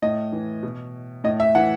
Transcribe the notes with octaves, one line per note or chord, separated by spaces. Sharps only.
A2 D#5
E3
B2
A2 D#5
E5
E3 F#5